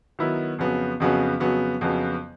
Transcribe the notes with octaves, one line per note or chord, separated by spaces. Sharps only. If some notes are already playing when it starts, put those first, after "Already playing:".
D#3 F#3 B3 E4
F2 C#3 F#3 B3
F2 C#3 F#3 B3
F2 C#3 F#3 B3
F2 C#3 F#3 B3